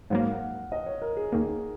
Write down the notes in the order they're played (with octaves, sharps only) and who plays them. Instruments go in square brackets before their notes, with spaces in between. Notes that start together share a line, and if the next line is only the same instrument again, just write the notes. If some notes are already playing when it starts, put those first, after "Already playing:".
[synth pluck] G#2 F#3 A#3 [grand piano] F5
[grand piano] F#5
D#5
C#5
A#4
G#4
[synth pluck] D#2 D#3 A#3